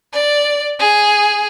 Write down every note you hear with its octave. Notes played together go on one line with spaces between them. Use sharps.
D5
G#4